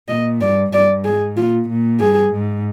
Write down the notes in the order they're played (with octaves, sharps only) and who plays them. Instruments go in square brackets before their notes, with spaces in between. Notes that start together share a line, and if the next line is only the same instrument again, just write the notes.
[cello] A#2 [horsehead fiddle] D#5
[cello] G2 [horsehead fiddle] D5
[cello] G2 [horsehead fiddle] D5
[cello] G#2 [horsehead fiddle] G#4
[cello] A#2 [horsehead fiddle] F4
[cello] A#2
[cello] G2 [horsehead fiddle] G#4
[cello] G#2